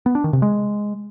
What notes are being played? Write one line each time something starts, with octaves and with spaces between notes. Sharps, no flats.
B3
D4
D#3
C3
G#3